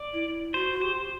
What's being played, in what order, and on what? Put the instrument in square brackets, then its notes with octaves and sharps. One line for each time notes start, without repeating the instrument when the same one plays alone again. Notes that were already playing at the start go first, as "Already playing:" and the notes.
Already playing: [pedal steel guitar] D5
[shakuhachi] E4
[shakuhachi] F#4 [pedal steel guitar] C5
[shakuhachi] F#4
[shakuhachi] G4 [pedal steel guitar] C5